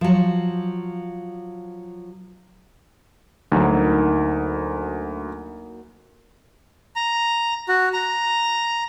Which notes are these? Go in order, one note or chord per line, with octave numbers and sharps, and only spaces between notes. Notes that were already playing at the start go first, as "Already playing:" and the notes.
F3 F#3
D2 F#3 A#3 D#4
A#5
F#4
A#5